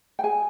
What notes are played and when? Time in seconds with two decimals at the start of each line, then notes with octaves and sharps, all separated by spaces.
0.19 G5
0.23 G#4 G#5